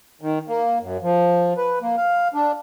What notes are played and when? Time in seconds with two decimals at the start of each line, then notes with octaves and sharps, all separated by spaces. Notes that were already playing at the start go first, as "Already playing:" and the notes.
0.21 D#3
0.48 A#3
0.81 F#2
1.02 F3
1.57 B4
1.82 A#3
1.97 F5
2.34 D4